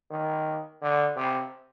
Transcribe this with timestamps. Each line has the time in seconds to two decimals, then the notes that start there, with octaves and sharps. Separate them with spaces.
0.11 D#3
0.81 D3
1.16 C3